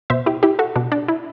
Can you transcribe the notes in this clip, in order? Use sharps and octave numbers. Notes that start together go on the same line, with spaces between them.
B2 C5 E5
E4 G4
E4 G4
F#4 A4
B2 D4
D4
E4